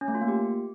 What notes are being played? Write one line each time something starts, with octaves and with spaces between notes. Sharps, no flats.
C#4
A3
F4
A#3
G4